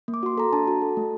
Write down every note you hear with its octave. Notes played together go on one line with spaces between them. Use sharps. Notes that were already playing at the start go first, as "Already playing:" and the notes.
A#3
D6
F#4 C6
A4 A#5
D4 A5
F#4
A4
A3